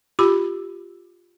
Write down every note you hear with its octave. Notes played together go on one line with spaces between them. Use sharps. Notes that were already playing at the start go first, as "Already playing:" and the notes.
F4 G4 B5